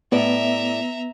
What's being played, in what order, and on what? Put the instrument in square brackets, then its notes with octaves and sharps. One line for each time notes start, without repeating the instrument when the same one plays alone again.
[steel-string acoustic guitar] A2 D5 [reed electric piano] B3 [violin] E5 A#5